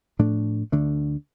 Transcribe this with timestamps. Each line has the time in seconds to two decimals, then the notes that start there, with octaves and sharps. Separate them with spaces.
0.19 A2 F3 A3 D4
0.72 D2 D3 A3 D4